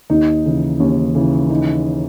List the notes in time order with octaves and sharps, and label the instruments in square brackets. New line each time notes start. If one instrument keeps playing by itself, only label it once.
[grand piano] D#2 [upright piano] D#4
[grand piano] C#3 E3
[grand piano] D#2 [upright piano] C#4
[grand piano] C#3 E3
[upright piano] D#4